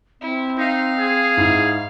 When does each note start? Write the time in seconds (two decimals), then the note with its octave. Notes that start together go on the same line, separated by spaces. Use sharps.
0.21 C4 E4
0.58 D#4 F5
0.99 G#4
1.37 G#2 E4 F7